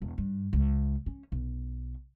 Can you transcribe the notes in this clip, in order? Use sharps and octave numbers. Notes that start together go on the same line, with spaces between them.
E1
G2
C#2
C#4
B1